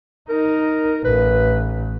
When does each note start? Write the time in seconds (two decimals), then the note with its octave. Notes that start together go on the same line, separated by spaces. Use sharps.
0.29 D#4 A#4
1.05 A1 B4